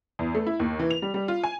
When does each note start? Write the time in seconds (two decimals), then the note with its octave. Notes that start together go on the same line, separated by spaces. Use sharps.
0.19 E2
0.35 A3
0.47 E4
0.60 D#2
0.79 E3
0.91 F7
1.02 G3
1.14 G3
1.28 F4
1.44 G#5